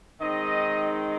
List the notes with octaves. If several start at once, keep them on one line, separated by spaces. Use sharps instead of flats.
D#3 G#3 C4 D#4 D#5